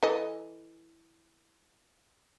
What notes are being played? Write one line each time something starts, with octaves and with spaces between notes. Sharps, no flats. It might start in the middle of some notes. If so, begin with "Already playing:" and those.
E3 A4 D#5